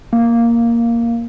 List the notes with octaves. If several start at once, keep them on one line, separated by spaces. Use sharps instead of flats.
A#3